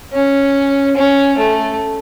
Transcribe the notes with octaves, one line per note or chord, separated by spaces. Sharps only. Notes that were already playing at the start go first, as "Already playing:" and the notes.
C#4
C#4
A3